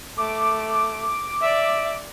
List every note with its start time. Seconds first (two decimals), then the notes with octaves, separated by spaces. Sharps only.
0.18 A3 D6
1.41 D5 E5